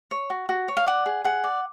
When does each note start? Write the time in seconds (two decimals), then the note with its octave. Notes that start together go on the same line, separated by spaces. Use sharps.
0.11 C#5
0.30 F#4
0.49 F#4
0.68 C#5
0.77 F5
0.86 D5 F#5
1.06 G#4
1.24 G#4 F#5
1.44 D5